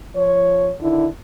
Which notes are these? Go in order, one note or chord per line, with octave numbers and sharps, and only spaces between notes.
F3 C#5
D3 D#3 E4